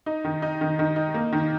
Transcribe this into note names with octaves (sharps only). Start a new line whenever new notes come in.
D#4
D#3
D#4
D#3
D#3
D#4
A#3
D#3